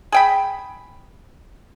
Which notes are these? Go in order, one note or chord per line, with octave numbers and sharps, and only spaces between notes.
G#4 G5 B5